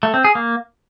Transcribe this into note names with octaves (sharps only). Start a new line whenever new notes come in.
A3
C4
G#4
A#3